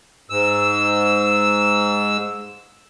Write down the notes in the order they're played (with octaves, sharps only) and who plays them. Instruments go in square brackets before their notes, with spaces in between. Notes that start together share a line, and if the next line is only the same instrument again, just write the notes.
[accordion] G#2 E6